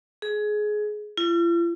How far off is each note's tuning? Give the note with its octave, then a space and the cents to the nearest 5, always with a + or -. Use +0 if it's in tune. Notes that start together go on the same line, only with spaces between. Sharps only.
G#4 +20
F4 -45